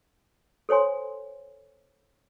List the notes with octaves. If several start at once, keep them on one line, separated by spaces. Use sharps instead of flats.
A4 C5 C#5 G#5 C6